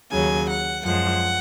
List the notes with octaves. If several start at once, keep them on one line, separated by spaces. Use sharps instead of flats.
D#2 C#3 F#3 G#5
F#5
F#2 F3 G#3 F#5